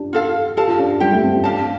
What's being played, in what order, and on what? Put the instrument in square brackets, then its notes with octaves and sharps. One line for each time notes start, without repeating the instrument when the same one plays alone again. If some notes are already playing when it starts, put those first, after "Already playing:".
Already playing: [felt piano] D4 G4
[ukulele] F4 A4 F5
[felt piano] G4 [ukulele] A4 F5 A5
[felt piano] F4
D4
[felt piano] G3 [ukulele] G4 C5 G5
[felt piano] A3
C4
[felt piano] D4 [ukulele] G4 F5 A5